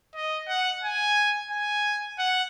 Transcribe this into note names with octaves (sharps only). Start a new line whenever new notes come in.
D#5
F#5
G#5
G#5
F#5